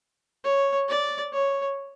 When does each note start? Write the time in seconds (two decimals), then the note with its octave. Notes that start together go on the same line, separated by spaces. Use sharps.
0.44 C#5
0.88 D5
1.33 C#5